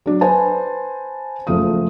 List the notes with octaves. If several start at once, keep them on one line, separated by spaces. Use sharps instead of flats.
F#3 D4
B4 C5 G#5 A5
F#1 F3 A3 F4 D#6